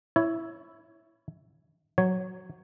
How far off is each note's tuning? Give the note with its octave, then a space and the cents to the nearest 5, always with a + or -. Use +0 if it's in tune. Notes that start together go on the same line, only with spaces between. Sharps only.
E4 +0 C#5 +10
F#3 +0 C#5 +0